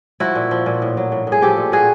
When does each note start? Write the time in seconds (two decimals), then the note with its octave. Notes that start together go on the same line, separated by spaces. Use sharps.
0.20 F3 E4 F#4
0.35 A#2
0.51 F3
0.66 A#2
0.82 A2
0.97 F#3
1.12 A2
1.27 A2 G#4
1.41 F3 G4 A4
1.57 A#2
1.72 A#2 F#4 G#4